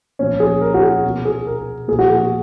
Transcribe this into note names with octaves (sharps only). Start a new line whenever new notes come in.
A#2 F3 C#4
G#4
A#4
F#4
G#4
B2
G#4
A#4
A#2 F3 G#4
F#4
G#4
F#4